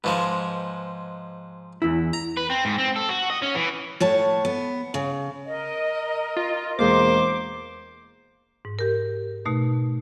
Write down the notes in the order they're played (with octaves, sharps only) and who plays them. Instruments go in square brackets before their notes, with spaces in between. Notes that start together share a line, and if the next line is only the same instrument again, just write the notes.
[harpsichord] G#2 F3 G#3 [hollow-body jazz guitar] B4
[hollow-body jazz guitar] E2 E4
[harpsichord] A#5
[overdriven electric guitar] B4
C4
G#2
C4
A4
F#4
D#5
C#4
E3
[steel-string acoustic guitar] A2 C#5 A5
B3
C#3
[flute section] A#4 D#5
[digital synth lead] F4
[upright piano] E1 G#3 A#3 [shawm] C5 [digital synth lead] D6
[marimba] G#2
G4 A#4
B2 A3 D#4